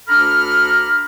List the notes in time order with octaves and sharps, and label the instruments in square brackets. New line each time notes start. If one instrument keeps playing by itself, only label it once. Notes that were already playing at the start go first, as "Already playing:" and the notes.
[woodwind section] D2 D4 A4 A#5 B5 F6